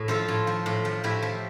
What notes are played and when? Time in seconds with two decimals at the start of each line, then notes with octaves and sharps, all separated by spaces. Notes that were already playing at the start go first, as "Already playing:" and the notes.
Already playing: A2
0.08 F3 F4 A4
0.28 A2
0.47 F3
0.66 A2
0.85 F3
1.04 A2 E4 G4
1.23 F3